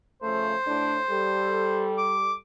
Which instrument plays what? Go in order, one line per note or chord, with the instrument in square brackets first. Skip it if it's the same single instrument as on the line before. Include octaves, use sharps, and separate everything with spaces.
[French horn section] C#3 F3 A3 [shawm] C5
[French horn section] A2 D4
G3 A4
[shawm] D6